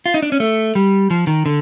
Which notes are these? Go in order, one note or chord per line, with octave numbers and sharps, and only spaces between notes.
F4
D#4
D4
C#4
A3
G3
F3
D#3
D3